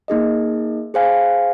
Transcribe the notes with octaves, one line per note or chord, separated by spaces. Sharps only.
A#3 D#4 G#4 D#5
G#4 C5 F5 G#5